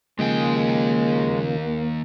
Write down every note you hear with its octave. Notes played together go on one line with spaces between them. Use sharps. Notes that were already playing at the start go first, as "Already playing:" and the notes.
D#2 C#3 F3 G#3 A#3 G#4 G5